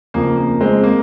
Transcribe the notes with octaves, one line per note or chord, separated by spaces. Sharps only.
F2 C#3 F3 A#3
A#3
G#3 C4
A#3